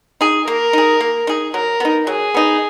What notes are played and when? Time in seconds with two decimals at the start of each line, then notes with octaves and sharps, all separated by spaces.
0.21 D#4 G#4
0.47 A#3 A#4
0.73 D#4 G#4
1.00 A#3
1.27 D#4 G#4
1.54 F#3 A#4
1.80 B3 D#4
2.07 F#3 G#4
2.34 B3 D#4